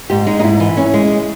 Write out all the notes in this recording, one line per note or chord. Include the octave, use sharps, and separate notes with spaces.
G#2 G4
G#3 D#4
D#4
G#2 E4
E3
C#4
G#3